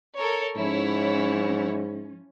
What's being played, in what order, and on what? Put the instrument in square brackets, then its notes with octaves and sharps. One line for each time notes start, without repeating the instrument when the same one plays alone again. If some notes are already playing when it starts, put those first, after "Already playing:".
[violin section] A4 A#4 C#5
[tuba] G#2 [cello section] F3 C#4 [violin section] E4 C#5